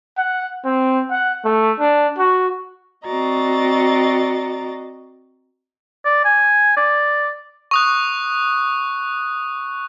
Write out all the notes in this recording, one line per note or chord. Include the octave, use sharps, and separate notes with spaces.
F#5
C4
F#5
A3
D4
F#4
C4 F#4 D5 D#5 A#5 A6
D5
G#5
D5
C#6 D#6 F#6